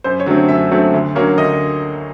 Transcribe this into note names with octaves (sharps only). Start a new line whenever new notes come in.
F#2 C5
C#5
D3 F#3 A3 C4
F#2 E5
D3 F#3 A3 C4
D2
D3 F#3 A#3 C#4
D2 D#5